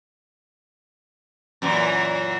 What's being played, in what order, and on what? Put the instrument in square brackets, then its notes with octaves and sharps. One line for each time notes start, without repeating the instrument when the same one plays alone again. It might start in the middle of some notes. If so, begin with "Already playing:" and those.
[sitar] F#2 A#2 E3